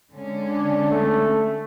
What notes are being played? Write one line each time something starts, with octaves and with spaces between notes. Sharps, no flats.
D3 G#3 C#4
D4
A3